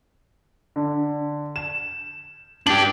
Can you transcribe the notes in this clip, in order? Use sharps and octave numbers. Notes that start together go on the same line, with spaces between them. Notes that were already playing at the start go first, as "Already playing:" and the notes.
D3
E7
D4 G4 F#7